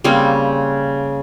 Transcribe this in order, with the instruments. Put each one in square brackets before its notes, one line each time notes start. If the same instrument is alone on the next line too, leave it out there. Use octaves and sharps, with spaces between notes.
[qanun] C#3 G3 A#3 C4